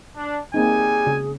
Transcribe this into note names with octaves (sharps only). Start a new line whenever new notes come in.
D4
G3 A#3 C4 D#4 G#4 G#5
C#3